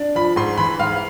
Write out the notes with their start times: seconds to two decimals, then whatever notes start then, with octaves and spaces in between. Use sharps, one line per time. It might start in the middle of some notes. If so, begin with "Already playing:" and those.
Already playing: D4
0.15 F3 B5
0.36 G#2 C6
0.58 E3 B5
0.79 G#2 F5